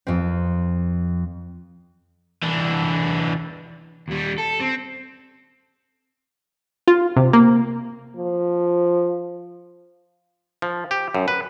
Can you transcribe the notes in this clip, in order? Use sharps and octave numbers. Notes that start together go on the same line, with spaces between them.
F2 C4
E3 D4
D#2 G3
A4
C4
F4
C3
A#3
F3
F3
G4
F#2
B4